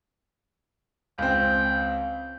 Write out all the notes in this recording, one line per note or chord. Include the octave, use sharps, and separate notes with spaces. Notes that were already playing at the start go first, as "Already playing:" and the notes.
C#2 C4 G5